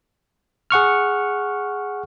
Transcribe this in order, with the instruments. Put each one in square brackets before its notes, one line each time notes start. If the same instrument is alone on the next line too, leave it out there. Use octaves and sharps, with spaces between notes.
[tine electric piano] G#4 F#5 C#6 F6